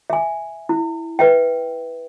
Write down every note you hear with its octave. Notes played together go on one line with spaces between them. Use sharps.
E5 G#5
E4
B4 E5 G5